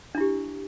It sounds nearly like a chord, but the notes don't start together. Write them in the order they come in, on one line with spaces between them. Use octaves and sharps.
D4 E4 G4